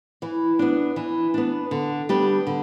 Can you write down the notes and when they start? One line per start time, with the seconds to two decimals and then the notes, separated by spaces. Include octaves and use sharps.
0.22 E3
0.59 B3 D4
0.96 E3
1.34 B3 D4
1.71 D3
2.09 G3 B3 D4 G4
2.47 D3